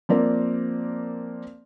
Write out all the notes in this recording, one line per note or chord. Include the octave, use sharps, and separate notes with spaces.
F3 A#3 C4 A#4 D5